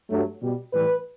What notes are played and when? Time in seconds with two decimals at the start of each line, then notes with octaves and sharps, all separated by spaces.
0.10 G2 F#3 A3
0.42 B2 G3
0.73 A2 E3 G3 B4